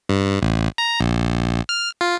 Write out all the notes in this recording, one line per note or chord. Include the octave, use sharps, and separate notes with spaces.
G2
A1
A#5
A#1
F6
F4